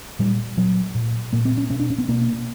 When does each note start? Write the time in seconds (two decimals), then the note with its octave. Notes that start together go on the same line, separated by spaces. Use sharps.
0.19 A#2 G3
0.57 A#2 F#3
0.95 A#2
1.33 A#2 A#3
1.45 C4
1.57 C#4
1.70 B2 C#4
1.79 D4
1.90 C#4
1.98 B3
2.08 B2 A#3